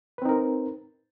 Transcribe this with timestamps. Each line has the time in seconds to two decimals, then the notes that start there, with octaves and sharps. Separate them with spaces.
0.18 B4
0.22 C4
0.25 D#4
0.29 A#4